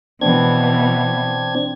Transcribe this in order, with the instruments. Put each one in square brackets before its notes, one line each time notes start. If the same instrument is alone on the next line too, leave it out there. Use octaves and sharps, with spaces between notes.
[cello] B2 E3 [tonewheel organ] C4 D4 G#6